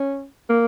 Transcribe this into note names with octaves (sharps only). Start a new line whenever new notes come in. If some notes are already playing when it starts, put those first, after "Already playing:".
Already playing: C#4
A#3